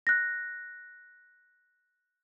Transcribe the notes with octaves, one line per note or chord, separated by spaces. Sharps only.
F#6 A#6